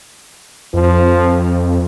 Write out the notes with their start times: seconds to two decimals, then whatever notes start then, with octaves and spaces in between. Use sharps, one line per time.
0.74 F2 F3